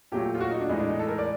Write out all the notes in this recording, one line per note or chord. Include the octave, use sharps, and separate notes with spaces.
A#2 F#3 A3 G4
F4
F#4
D#4
D4
A2 E3 G#3 D#4
D4
D#4
A4
A#4
D5